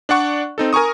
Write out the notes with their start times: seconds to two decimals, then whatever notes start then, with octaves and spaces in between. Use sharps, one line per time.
0.09 D4 D5 F#5 C#6
0.58 C4 D#4 A4
0.73 A#4 G#5 A#5 C#6 D#6